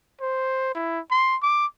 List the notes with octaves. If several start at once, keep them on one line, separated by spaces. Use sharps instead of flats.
C5
E4
C6
D6